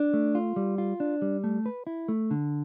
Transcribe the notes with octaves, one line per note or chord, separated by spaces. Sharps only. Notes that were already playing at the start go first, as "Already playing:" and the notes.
Already playing: D4
A3
F4
G3
F4
D4
G3
A3
B4
E4
A3
D3